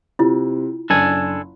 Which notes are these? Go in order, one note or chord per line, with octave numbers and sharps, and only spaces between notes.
C3 E4 F4
F#1 D4 A4 G#5